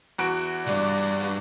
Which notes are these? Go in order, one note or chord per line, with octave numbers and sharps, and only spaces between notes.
E2 F#4 D7
B1 G2 D5